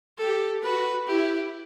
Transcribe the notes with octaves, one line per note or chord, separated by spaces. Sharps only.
G4 A4
F#4 B4
E4 G4